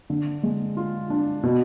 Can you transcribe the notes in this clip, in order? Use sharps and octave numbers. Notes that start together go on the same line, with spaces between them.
D3
G#3
F4
D4
B2